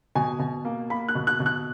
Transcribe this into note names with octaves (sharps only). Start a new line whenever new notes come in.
B2 G#5
B2
A#3
A#3 B5
F#6
B2
F#6
B2
F#6